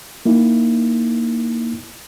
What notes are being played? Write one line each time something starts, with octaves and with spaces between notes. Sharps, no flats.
A#3 D#4 E4